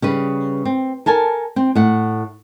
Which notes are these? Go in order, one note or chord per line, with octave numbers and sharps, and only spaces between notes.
C#3 G3 B4
C4
A4 A#4 G#5 A5
C4
A2 F#5